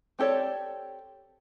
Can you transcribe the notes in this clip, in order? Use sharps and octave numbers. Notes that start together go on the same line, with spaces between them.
C4 G4 A4 C#5 D5